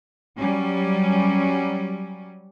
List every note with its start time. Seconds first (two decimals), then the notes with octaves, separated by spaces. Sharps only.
0.36 F#3 G3 C#4